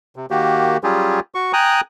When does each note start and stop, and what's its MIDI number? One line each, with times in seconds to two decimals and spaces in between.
0.16 0.26 48
0.31 0.77 51
0.31 0.77 58
0.31 0.77 66
0.31 0.77 67
0.83 1.20 54
0.83 1.20 55
0.83 1.20 61
0.83 1.20 65
0.83 1.20 67
0.83 1.20 68
1.35 1.52 66
1.35 1.52 85
1.53 1.81 79
1.53 1.81 80
1.53 1.81 82
1.53 1.81 87
1.53 1.81 90